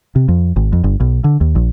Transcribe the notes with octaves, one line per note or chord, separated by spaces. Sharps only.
C3
F2
G#1
F2
G1
B1
D3
D#2
A#1